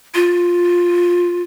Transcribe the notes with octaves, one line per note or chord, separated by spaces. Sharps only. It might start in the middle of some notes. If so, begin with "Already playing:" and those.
F4